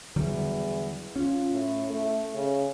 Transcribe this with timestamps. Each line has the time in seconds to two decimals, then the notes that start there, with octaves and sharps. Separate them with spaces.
0.16 E2 D3 F#3 G3
1.16 C#4 F4
1.51 A2
1.90 A3
2.35 C#3